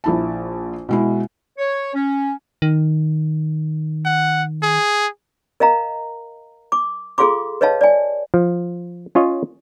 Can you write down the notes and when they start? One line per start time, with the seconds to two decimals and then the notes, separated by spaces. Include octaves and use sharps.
0.04 A#1 E4 A5
0.89 B2 G#3 E4
1.58 C#5
1.94 C#4
2.62 D#3
4.05 F#5
4.63 G#4
5.60 A#4 D#5 F5 A#5
6.72 D6
7.18 F4 G#4 A4 F5 C6 D6
7.61 B4 C#5 D#5 F5 A5
7.81 D5 G#5
8.34 F3
9.15 C#4 F4 C#5 D#5